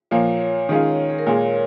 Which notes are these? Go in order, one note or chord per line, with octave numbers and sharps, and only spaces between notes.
A#2 F3 A#3 C#5
D#3 G#3 C#4 F4
G#4
A#4
A#2 G#3 F4 C#5